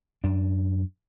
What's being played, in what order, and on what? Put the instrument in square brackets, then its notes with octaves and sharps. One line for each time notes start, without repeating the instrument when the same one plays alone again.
[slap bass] F#2 D4